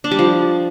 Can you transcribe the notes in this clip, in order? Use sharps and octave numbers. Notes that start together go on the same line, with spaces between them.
D4
G3
F3